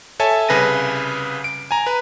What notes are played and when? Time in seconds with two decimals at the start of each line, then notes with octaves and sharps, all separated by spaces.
0.20 A4 C#5 E5 G#5 A5
0.49 C2 C#3 B4 G#5 A#6 D#7
1.44 D7
1.71 G#5 A#5
1.87 B4